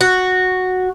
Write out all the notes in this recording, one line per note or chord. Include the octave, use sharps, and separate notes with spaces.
F#4